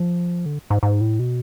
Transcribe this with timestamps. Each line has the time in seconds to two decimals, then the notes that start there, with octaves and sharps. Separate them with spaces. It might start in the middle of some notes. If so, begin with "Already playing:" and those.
Already playing: F3
0.46 D3
0.70 G#2
0.83 G#2
1.01 A2
1.19 B2